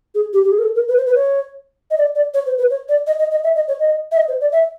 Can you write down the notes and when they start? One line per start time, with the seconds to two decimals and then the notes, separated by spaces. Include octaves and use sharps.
0.15 G#4
0.33 G4
0.45 G4
0.51 G#4
0.59 A#4
0.63 A4
0.75 A#4
0.88 B4
0.97 C5
1.06 B4
1.15 C#5
1.91 D#5
1.98 D5
2.15 D5
2.34 C#5
2.46 C5
2.58 B4
2.70 C#5
2.89 D5
3.07 D#5
3.19 D#5
3.31 D#5
3.44 E5
3.55 D#5
3.68 C#5
3.80 D#5
4.12 E5
4.17 D#5
4.28 C5
4.41 D5
4.52 E5